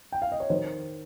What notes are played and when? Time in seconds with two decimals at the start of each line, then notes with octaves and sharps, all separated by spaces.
0.12 G5
0.22 F5
0.32 D#5
0.40 C#5
0.50 D#3 C5